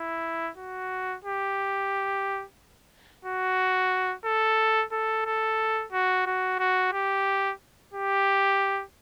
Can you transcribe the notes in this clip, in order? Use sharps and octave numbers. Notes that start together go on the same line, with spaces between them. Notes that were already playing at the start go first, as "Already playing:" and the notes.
Already playing: E4
F#4
G4
F#4
A4
A4
A4
F#4
F#4
F#4
G4
G4